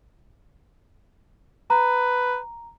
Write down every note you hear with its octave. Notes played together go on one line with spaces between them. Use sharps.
B4 A#5